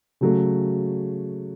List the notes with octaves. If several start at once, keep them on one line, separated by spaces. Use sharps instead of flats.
C#3 F#3 A3